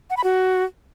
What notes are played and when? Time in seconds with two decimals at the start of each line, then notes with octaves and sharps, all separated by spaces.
0.10 F#5
0.17 B5
0.24 F#4